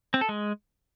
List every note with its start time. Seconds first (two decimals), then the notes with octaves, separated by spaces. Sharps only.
0.14 C4
0.21 A4
0.29 G#3